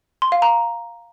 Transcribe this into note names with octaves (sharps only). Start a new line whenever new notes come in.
C6
F5
A#5